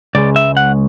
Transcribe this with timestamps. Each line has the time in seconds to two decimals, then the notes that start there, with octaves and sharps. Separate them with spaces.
0.15 C#2 C#3 G#3 D5
0.36 E5
0.57 F#5